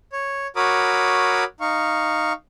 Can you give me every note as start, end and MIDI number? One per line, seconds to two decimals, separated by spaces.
0.13 0.47 73
0.56 1.44 66
0.56 1.44 70
0.56 1.44 73
0.56 1.44 83
0.56 1.44 86
0.56 1.44 87
1.61 2.33 63
1.61 2.33 77
1.61 2.33 85